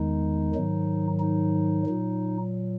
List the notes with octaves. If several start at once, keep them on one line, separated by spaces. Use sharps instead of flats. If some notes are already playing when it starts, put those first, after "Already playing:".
Already playing: E2 D#3 G#3 D#4
G#2 D#3 F#3
D#4
A#2 F#3